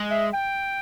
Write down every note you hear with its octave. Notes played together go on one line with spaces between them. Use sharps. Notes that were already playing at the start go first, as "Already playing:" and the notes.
Already playing: G#3
E5
G5